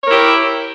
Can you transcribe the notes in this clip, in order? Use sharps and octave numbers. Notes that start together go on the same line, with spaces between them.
E4 G4 A#4 C#5